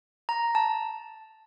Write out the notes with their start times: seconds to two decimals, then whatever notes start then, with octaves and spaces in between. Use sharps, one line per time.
0.29 A#5
0.55 A5